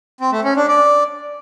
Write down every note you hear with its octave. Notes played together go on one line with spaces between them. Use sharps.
C4
A3
C#4
D4
D5